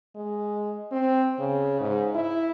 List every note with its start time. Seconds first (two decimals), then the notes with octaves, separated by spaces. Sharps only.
0.15 G#3
0.92 C4
1.39 C#3
1.80 G#2
2.15 E4